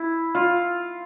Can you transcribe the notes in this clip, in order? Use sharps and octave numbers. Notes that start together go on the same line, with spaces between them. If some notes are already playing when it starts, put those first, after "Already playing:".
Already playing: E4
F4